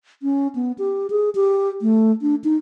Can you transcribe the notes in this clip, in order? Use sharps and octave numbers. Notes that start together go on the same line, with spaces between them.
C#4
B3
G4
G#4
G4
A3
D4
D#4